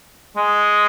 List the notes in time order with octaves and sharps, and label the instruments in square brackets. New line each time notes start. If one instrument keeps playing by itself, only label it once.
[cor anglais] G#3